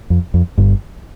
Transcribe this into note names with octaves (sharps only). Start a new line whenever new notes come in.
F2
F2
G1 G2